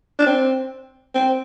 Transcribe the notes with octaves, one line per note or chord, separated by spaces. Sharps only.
D4
C4
C4